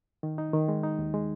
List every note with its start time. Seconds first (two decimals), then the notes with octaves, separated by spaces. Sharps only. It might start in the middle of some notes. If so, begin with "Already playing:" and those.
0.23 D#3
0.38 D#4
0.54 D#3
0.68 G#3
0.83 D#4
0.99 D#2
1.14 G#3